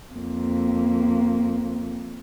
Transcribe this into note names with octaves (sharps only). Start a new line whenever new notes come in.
F2 A#3